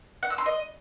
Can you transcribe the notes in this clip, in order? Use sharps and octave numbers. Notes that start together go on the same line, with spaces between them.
F#5
E6
C6
D#5